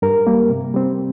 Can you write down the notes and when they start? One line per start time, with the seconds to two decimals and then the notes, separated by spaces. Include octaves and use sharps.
0.02 G2 A#4
0.27 G3 A#3
0.50 C3
0.74 G3 C4